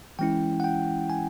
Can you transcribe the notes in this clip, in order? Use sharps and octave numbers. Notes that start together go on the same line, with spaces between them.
E3 G#3 C#4 E4 G5
F#5
G5
G#5